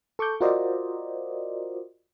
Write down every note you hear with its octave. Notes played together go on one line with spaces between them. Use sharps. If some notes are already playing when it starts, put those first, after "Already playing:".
A4 C#6 D6 G6
F4 F#4 A#4 C5 D5 D#5